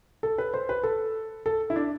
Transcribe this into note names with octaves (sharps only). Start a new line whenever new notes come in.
A4
B4
C5
B4
A4
A4
E4
D4